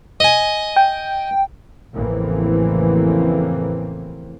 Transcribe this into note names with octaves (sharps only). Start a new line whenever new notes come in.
D#5 G#5
G5
A1 F2 C#3 E3 A#3 C4